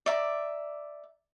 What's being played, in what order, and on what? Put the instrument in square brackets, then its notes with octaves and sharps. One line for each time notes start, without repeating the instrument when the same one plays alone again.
[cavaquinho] D5 E5 A#5